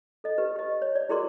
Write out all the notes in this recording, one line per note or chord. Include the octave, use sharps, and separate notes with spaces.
A4 D#5
G4 B4
G4 D#5
C#5
D5
E4 F#4 G#4 A#4 D5 C6